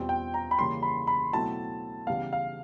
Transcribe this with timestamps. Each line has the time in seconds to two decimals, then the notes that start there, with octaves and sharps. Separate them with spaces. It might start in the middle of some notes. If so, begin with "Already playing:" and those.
Already playing: E2 B2 G3 C4 F4
0.09 G5
0.34 A#5
0.51 B5
0.58 C#3 E3 G3 A#3 C#4 C6
0.82 B5
1.07 B5
1.33 B2 F#3 A3 C4 E4 A5
2.07 C#3 E3 G3 B3 F5
2.33 F5